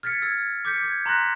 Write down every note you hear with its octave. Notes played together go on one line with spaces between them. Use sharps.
F6 G#6 A6 B6 C#7
E6 G#6 A6
D6 G6 B6 C#7
G#6
A#5 C6 F#6 A#6 B6